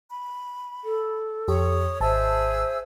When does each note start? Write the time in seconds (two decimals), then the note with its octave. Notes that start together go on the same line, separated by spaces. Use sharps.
0.09 B5
0.84 A4
1.48 F2 G4 C#5 C#6 D#6
2.01 G#1 G#4 C5 E5 A5 E6